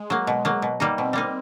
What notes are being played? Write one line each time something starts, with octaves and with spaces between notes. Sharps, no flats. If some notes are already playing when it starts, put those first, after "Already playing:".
Already playing: G#3
F#3 A#3
B2
F#3 A#3
B2
G3 A#3 D#4
B2 C4
G3 A#3 D#4